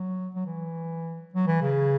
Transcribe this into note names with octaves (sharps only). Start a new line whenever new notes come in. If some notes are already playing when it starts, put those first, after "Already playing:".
Already playing: F#3
F#3
E3
F#3
E3
C#3